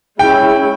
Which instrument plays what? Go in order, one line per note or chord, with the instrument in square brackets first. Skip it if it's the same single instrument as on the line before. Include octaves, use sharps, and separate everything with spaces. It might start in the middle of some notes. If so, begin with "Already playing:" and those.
[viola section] G#3 C#4 E4 [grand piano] G5